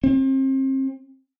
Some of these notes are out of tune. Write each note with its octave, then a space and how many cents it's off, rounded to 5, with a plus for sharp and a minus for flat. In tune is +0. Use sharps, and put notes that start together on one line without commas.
C4 +35